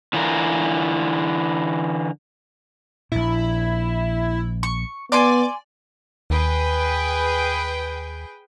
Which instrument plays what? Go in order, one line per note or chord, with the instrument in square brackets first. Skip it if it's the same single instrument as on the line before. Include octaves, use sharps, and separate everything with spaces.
[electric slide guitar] D3 E3 F4 A#4
[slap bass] A#1 A#2 [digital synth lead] E4
[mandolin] C#6
[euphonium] B3 [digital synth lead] D5 [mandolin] G#5 C6 D6
[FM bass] D#2 [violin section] G#4 B4 G5